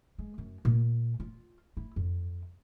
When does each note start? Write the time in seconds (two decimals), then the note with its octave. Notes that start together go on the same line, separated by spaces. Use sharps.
0.18 G#3
0.38 F#2
0.65 A#2
1.20 F4
1.77 E4
1.96 F2